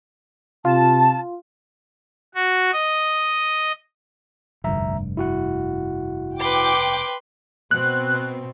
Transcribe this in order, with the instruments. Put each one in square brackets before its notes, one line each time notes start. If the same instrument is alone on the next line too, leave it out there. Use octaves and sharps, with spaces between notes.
[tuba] C3 [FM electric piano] F4 [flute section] A5
[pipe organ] F#4
D#5
[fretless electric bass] F1 G2 [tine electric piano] D2 E5 A#5
[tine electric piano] E4 F#4 F#5
[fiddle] B4 C6 [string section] G5 D6
[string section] B2 C4 [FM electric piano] F#6